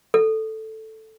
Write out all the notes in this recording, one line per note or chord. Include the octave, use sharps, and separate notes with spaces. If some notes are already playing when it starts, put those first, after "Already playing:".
A4